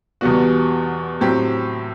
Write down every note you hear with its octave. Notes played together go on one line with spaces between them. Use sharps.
E2 B2 G3 B3 F#4
A2 F#3 C4 G4